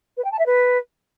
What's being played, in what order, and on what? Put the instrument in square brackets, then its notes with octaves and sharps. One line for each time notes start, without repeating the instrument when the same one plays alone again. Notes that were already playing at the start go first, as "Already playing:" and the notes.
[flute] B4
G5
A5
E5
B4